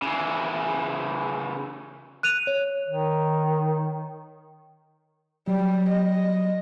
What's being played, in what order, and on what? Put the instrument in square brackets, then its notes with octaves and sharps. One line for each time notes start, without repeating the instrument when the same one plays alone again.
[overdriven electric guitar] C#3 E3
[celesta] F#6 D#7 F7
C#5
[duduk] D#3
[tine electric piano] F#3 [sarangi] G3
[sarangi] D#5